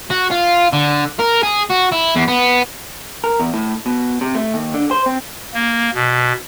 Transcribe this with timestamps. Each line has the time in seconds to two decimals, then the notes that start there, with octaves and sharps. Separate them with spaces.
0.10 F#4
0.31 F4
0.73 D3
1.19 A#4
1.43 G#4
1.70 F#4
1.92 E4
2.16 E2
2.28 B3
3.24 A#4
3.40 E2
3.54 A2
3.86 B2
4.21 C3
4.35 A3
4.54 D#2
4.74 D3
4.91 C5
5.06 C4
5.54 A#3
5.94 B2